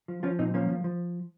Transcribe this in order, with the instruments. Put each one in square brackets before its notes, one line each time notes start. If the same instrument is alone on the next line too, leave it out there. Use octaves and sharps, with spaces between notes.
[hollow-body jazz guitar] F3
F3 C#4 F4
A#2 C4 D#4
F3 A#3 C#4
F3
F3